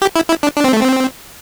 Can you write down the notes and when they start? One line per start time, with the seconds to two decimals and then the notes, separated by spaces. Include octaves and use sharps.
0.02 G4
0.16 E4
0.29 E4
0.43 D4
0.56 D4
0.64 C4
0.73 A3
0.81 C4